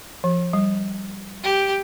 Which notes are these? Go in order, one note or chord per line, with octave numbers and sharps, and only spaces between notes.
F3
G3
G4